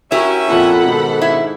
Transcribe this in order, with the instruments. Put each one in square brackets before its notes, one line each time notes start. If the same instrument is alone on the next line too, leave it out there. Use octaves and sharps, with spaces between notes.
[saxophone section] C#4 E5 [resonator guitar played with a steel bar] E4 G4 A#4 [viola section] F#4
[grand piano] F2 A#2 F4 [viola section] A4 F#5 B5
[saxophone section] G#2 [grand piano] B2 D#3
[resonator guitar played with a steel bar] E4